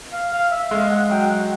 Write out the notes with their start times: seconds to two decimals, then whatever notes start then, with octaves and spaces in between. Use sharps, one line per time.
0.13 F5
0.32 F5
0.51 E5
0.71 G#3 F5
0.90 F#5
1.10 F#3 G5
1.30 F#5